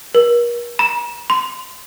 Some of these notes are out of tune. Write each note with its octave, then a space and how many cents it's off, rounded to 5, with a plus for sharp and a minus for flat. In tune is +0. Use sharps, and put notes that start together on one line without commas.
A#4 +40
A#5 +45
C6 -25